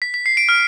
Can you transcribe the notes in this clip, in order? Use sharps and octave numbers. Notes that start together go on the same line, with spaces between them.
B6
B6
C7
D7
F6